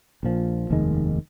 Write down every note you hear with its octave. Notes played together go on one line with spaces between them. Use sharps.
A#1 A#2 F3
F1 D#2 D#3 G#3